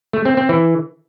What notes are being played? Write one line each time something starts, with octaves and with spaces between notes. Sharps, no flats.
A3
C4
C4
E3